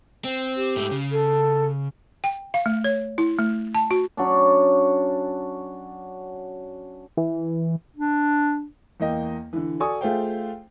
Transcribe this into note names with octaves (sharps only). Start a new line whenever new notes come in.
C4
G4
G#2 A3
C#3
A4
G5
F5
A3
C#5
E4
A3
A5
F#4
F#3 C#4 D4
E3
D4
E2 A#3 D#5 G5
D3 E3
F#4 A4 D5 G#5 C#6 D#6
A3 F4 G#4 C5 F5 G5